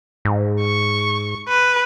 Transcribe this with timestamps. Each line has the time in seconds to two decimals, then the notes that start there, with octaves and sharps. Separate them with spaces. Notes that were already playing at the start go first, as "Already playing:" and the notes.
0.25 G#2
0.61 C#6
1.48 B4